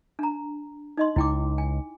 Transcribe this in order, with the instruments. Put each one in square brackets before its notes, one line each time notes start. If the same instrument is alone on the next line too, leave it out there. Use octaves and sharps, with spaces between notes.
[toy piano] D4 A#5
D#4 D#5 C6
[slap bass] C#2 [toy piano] E4 G5 D6
[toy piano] G#5